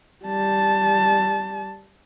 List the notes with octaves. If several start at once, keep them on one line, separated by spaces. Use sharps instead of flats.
G3 A5